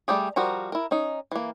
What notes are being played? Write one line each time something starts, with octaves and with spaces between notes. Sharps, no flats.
G3 A3 G4 G#4
F3 G3 F#4 A#4 A#5
E4 A#4
C#4 D#4
E3 A#3